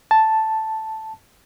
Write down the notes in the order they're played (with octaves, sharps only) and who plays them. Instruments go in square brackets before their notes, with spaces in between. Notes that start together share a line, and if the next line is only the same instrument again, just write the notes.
[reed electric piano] A5